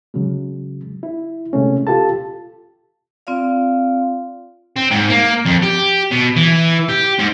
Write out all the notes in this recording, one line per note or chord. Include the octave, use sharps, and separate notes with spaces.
C#3 F#3 G#3
E4
C3 G#3 A3 C#4
F4 G4 A4 A5
C4 F4 D5 F5
C4
G#2
A#3
F2
G4
B2
E3
G4
G#2